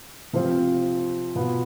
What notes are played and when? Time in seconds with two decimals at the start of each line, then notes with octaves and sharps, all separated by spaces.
0.33 C3 F3 C4 F4
1.35 B2 B3 F4